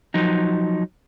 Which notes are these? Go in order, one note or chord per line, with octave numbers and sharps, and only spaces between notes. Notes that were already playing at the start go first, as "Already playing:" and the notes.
F3 F#3 D#4